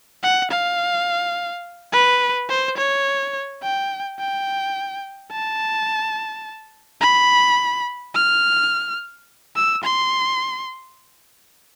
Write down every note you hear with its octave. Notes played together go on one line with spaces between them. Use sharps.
F#5
F5
B4
C5
C#5
G5
G5
A5
B5
F6
E6
C6